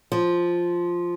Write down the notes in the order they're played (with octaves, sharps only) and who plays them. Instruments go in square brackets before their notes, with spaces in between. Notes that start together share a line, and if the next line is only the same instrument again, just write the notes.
[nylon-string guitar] F3